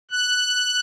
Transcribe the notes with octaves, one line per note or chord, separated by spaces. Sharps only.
F#6